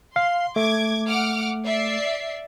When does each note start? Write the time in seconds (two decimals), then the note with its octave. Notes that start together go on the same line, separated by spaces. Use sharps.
0.16 F5 C6
0.56 A3 D6 G#6
1.06 F#5 D6 F6
1.64 D5 E5 C7